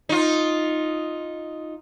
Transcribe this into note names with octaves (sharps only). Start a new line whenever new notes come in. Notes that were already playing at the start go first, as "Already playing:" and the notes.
D#4 F4